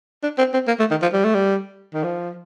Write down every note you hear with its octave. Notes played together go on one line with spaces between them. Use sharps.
D4
C4
C4
A#3
A3
D#3
F3
G3
A3
G3
D#3
F3